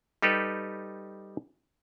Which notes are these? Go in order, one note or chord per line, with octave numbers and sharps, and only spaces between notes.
G3 D#4 G4 A4 B4